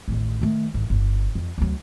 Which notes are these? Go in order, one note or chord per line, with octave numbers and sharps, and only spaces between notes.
A1 D#2
D#3 A3
G#1 E3
G1 D3
F2
D2 F#3